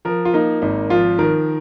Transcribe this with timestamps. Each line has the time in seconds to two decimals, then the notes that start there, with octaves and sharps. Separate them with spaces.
0.05 F3 A#4
0.25 F4
0.34 A#3 D#4
0.62 G#1 D#4
0.90 F3 F4
1.19 D#3 A#4